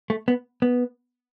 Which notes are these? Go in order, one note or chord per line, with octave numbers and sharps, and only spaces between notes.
A3
B3
B3